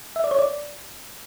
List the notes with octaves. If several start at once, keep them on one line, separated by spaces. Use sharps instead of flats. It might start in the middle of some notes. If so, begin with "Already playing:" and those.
E5
D5
C#5
D5